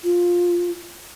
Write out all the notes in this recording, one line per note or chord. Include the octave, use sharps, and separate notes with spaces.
F4